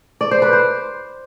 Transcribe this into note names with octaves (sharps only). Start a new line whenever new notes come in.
D5
C5
B4
C5